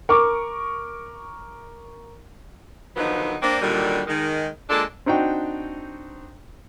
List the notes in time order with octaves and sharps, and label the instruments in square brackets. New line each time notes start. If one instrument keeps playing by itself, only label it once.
[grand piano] A#4 C#6 D6
[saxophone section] D3 D#3 F3 F#3 B3 D#4
A#3 C4 D4
A#2 D3 D#3 F#3 G3
D#3 G#3
G#3 A#3 D4 F4 A4
[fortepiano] C4 D4 D#4 F#4 G5